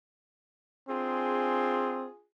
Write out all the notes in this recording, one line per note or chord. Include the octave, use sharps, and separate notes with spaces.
C4 D4 F4 G#4